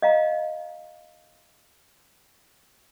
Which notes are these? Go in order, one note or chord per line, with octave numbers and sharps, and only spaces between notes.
D#5 F5 A#5